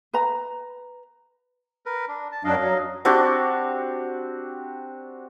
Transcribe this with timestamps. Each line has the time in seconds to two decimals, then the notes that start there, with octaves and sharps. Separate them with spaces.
0.14 B4 A#5
1.86 A#4 B4
2.08 D4
2.32 A5
2.45 F#2 F#3 D4 D#5 F5
2.59 F#3
3.05 C4 D4 F#4 G4